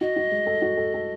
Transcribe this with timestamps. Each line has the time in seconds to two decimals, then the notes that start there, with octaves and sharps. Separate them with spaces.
0.01 F#4 D#5
0.16 F#4
0.31 G#3
0.47 A4
0.62 F#4
0.77 A4
0.94 A4